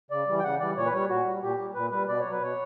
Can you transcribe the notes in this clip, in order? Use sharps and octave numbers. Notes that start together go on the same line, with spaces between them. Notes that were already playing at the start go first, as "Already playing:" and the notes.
C#3 D5
E3 G3
G5
C#3 F#5
E3 G3 D5
A#2 C#5
B4
G3 C#5
A#2 F#4
G3
A#2 G4
G3
A#2 B4
G3 B4
B2 D5
C#5
F#3
B4
B2 C#5